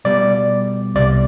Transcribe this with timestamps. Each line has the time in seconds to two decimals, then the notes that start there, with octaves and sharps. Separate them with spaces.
0.05 B2 G3 B3 D5
0.95 C2 C3 G3 B3 D5